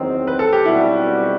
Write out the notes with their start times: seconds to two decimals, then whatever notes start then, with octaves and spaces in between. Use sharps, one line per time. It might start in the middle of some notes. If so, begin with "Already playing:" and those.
Already playing: F#1 E2 D#3 F#3 C4
0.27 B4
0.39 A4
0.53 G4
0.65 B1 B2 G3 C4 E4 F#4